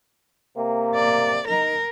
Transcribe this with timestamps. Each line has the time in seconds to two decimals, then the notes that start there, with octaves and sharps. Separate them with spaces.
0.56 C3 A#3
0.95 D5
1.48 D#4 A#4